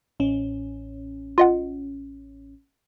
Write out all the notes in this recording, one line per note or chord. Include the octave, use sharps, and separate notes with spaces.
A1 C#4
F4 D#5 F#5